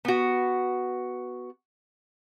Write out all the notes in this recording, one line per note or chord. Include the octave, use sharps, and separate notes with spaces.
B3 F#4